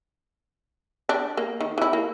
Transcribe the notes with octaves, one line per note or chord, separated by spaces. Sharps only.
D4
A#3
D#3
E3 E4
A#3